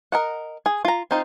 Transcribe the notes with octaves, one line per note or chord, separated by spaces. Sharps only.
A#4 D#5 F#5
G#4
F4 A#5
C4 D#4 F4